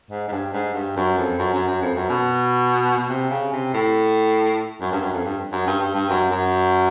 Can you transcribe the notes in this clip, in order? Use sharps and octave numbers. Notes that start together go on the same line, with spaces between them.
G#2
G#2
G2
G#2
G2
F#2
F2
F#2
F#2
F#2
F2
F#2
B2
B2
C3
C#3
C3
A2
F#2
G2
F#2
F2
G2
F#2
G2
G2
G2
F#2
F#2